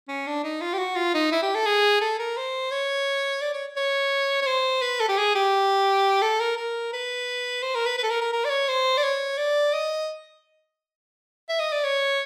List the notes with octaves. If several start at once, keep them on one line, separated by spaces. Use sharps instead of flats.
C#4
D4
D#4
F4
G4
F#4
F4
D#4
E4
G4
A4
G#4
A4
A#4
C5
C#5
D5
C#5
C#5
C#5
C5
B4
A4
G4
G#4
G4
A4
A#4
A#4
B4
C5
A#4
B4
B4
A4
A#4
A#4
A#4
D5
C#5
C5
D5
C#5
D5
D#5
E5
D#5
D5
C#5